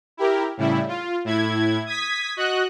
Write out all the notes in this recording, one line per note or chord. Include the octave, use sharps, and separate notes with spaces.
E4 G4 A#4
A2 C#3 G3 E4
F4
A2 E4 G#6
D#6 G#6 B6
F#4 D#5 F#6